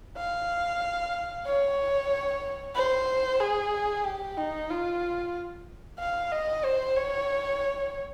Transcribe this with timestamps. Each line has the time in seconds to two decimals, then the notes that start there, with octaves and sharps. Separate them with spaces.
0.17 F5
1.46 C#5
2.75 C5
3.40 G#4
4.05 G4
4.37 D#4
4.70 F4
5.99 F5
6.32 D#5
6.64 C5
6.96 C#5